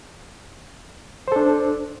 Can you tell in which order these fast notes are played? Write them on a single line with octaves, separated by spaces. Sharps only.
C5 A4 D4